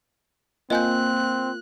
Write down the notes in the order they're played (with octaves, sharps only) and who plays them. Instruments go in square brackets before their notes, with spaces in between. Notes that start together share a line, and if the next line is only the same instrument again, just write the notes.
[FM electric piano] A#3 F4 [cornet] C4 [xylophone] D#5 G#5 G6 [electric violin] F#6